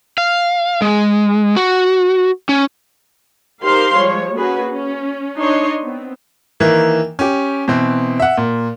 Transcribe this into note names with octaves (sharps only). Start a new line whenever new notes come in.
F5
G#3
F#4
C#4
D#4 G4 A#4 C5 F5 C6
F3 G3 G#3 C#5
A#3 C#4 F#4 G#4 B4
C#4
D4 D#4 C#5 D#5 C6
B3 C4
D#3 E3 A#3
C#4 G4
B2 E3 C4
E5 F#5
A#2